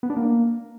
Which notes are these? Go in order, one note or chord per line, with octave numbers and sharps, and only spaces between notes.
B3
D4
A#3